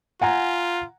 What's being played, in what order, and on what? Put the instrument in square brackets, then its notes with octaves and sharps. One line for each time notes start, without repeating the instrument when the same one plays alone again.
[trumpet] F4 [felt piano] F#5 G#5 A#5